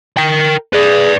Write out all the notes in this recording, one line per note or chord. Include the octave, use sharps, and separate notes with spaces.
A#4 G5
G#4 B4 D5